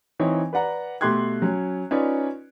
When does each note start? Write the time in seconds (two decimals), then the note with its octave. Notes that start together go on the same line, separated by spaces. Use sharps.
0.19 E3 C4 D#4 C#5
0.53 B4 D5 F#5 A#5
1.01 B2 A3 G4 C6 F#6 G#6
1.42 F#3 C#4
1.91 C#4 D#4 F4 B4 C#5 D5